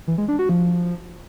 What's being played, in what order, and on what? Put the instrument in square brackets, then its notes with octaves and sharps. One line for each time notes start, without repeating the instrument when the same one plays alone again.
[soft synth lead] E3
G#3
D4
F#4
F3